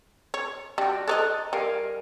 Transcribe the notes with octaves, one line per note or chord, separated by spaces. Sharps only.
C#5
G3 D4 F#4 G5
A4 C#5 D#5 A#5 D#6 F#6
G3 A#4 F5 G#5